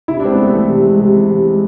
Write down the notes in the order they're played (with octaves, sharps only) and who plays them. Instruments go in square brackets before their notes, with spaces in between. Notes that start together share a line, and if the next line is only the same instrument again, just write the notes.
[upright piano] C3 [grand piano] E4
[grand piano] D4
[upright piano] G#3 [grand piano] C4
[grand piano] B3
[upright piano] C3 [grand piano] A3
[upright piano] E3 [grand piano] A3
[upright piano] C3
G#3
C3
E3
C3
G#3